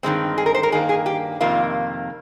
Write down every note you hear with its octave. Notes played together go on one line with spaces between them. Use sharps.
G2 D#3 G#3 C4
G#4
A#4
C5
A#4
G2 D#3 A#3 G#4
G#4
G4
F2 C3 D#3 A#3 F4